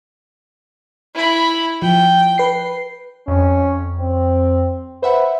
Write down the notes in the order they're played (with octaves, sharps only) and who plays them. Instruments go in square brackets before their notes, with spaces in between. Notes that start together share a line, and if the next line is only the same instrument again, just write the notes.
[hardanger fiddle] E4 B5
[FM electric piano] F3 [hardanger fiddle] G5
[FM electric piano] B4 C7
[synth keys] F2 [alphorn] C#4
[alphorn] C4
[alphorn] B4 [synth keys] C5 E5 F#5